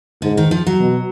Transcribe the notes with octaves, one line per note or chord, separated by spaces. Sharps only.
G#2 D3
D#3
F3
F#3
B2